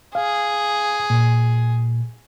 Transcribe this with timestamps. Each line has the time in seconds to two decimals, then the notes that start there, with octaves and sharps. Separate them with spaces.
0.15 G#4 F5
1.10 A#2